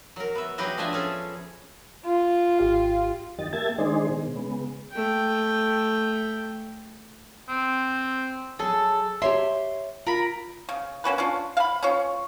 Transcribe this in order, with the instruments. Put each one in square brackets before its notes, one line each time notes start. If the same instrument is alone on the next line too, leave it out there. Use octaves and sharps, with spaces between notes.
[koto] F#3 A#4
B3 E5
F#3 G4 G#4 B4 D#5
F3 D4 G#4 D#5 E5 G#5
C#4 G#4 A4
[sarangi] F4
[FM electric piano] G#1 G4 F5
[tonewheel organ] F#2 D#3 G4 D#5 A6
A#3 G4 E5 A5 G#6 A6
D#3 G#3 D4 D#4 G#4 C5
B2 D#3
C#3 G#3 B3
[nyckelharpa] A3 G5
[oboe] C4
[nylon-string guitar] F#3 G#4 G#5 [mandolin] A4
[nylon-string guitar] G4 C#5 E5 [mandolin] C6
[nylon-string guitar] F4 [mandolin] A#4 B5
[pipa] C#3
A#3 C#4 F#4 B4
C#4 D4 F4
F5 B5
C#4 F4 C#5